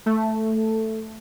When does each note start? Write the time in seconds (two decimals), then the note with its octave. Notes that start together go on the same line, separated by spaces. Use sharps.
0.06 A3